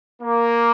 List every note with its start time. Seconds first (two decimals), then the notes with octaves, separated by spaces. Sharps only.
0.21 A#3